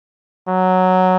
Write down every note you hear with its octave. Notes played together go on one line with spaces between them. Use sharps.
F#3